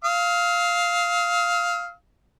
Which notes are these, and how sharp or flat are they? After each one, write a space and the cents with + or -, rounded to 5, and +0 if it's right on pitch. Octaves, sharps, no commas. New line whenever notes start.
F5 +0 D#6 +45